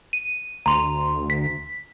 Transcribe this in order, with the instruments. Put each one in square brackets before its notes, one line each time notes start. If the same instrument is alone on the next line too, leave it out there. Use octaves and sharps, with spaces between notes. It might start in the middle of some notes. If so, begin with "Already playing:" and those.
[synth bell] D#7
[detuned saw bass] D2 [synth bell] A#5 C6
[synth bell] B6